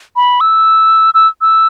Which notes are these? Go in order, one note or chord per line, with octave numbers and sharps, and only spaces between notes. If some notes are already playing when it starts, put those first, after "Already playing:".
B5
E6
E6
E6